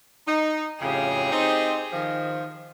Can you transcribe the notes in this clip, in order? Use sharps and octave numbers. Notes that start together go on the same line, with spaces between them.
D#4
F2 A2 C#3 G4 G#4
C4 D#4
D#3 F3